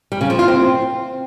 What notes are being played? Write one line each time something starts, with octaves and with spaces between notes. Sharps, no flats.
G3
C#3
F3
F4
C4